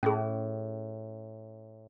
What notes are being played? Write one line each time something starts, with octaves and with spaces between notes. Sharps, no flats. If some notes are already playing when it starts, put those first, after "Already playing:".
A2 C#4 G#4